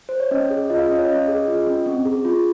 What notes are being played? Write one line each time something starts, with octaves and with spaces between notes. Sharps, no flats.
C5
C#5
C#4 D#5
G#4
F4 D#5
F5
D#5
C#4
C#5
C#4 D#5
G#4
F4
C#4
C4
G#4
F4